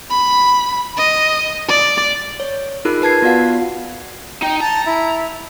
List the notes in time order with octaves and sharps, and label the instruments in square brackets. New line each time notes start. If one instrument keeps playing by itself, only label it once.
[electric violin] B5
D#5
D5
[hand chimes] C#5
D#4 F4 G#4 A#4 B5 F#6
B4 A5 G#6 C7
B3 F4 F#4 D5 F5 F#5
[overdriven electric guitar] D#4 [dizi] G5
[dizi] A5 [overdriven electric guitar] A#5
[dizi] E4